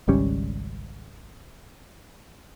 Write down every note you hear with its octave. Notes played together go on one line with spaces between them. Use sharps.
G#1 C#2 G3 C#4